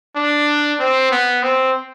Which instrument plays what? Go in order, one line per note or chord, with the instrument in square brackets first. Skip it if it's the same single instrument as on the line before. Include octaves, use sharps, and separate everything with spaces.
[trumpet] D4
C4
B3
C4